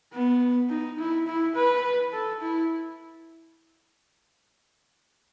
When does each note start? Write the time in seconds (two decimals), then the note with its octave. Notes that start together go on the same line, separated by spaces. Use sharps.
0.13 B3
0.69 D#4
0.98 E4
1.27 E4
1.55 B4
2.12 A4
2.40 E4